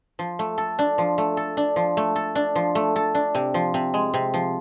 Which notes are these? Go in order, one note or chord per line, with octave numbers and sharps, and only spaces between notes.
F3
A3
A4
D4
F3
A3
A4
D4
F3
A3
A4
D4
F3
A3
A4
D4
C3
F3
C3
G#3
C3
F3